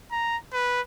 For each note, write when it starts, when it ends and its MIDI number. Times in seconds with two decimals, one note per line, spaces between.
0.12 0.37 82
0.53 0.82 71